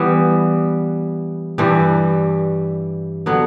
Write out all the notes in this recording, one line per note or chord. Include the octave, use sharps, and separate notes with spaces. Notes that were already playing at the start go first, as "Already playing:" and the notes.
Already playing: E3 G3 B3
G2 E3 G3
D3 F#3 B3